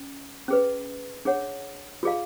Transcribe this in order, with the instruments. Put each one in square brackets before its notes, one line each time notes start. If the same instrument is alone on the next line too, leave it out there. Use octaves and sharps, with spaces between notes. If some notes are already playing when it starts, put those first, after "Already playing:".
Already playing: [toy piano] C#4
C#4 G#4 B4
D4 G#4 C#5 F#5
F4 G#4 D5 F5